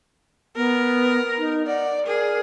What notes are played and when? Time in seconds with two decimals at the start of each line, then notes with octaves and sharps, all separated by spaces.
0.56 B3 A#4
1.39 D#4
1.67 D5 F#5
2.06 G#4 A#4